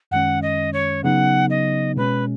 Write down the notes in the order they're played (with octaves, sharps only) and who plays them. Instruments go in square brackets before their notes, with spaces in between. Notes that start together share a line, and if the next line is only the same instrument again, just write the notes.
[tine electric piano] F#2 D#3 G#3 C#4 [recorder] F#5
[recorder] D#5
C#5
[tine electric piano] C#3 F#3 B3 D#4 [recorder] F#5
[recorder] D#5
[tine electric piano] B2 G#3 C#4 [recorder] B4